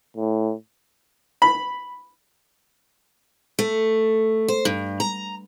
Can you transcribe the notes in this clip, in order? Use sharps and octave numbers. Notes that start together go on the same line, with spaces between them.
A2
B5
A3
C5
G2
A#5